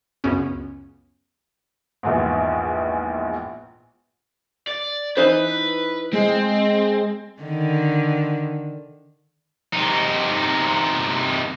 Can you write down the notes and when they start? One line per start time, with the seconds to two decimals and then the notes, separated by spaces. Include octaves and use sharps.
0.24 C#2 F#2 C#3 B3 C#4
2.03 A#1 E2 G#2
4.67 D5
5.17 E3 D#4 B4 C5
6.13 G#3 C4
7.42 D3 D#3
9.73 C3 D#4